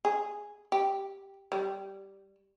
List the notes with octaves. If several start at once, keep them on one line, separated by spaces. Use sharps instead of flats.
G#4
G4
G3